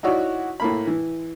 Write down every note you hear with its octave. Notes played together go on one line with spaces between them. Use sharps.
D#4 E4 F#4 C#5 D5
A2 A#3 B5
E3